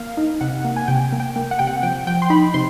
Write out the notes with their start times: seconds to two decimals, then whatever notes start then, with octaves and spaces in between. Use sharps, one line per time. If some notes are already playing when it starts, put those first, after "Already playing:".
Already playing: A#3 F5
0.17 D#4
0.41 C3 F#5
0.65 A#3
0.76 G#5
0.88 C3 G5
1.12 A#3
1.20 G5
1.36 A#3
1.51 F#5
1.59 C3 G5
1.67 F#5
1.83 F3 G5
2.07 F3 G5
2.22 C6
2.30 D#4 B5
2.54 C3 C6